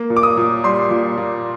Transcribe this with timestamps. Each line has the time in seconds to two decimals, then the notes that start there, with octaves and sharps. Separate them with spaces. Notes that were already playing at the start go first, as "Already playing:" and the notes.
Already playing: A#3
0.10 A#2
0.17 D6
0.23 D#6
0.37 A#2
0.64 G3 C6
0.91 A#2
1.18 A#2